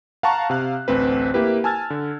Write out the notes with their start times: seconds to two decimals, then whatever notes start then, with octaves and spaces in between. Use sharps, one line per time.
0.23 F5 F#5 A5 A#5 C#6
0.50 C3 F5 F#6
0.88 A1 D2 C4 B4
1.34 A#3 E4 G4 B4
1.64 G#5 A5 E6 F6 G#6 A6
1.90 D3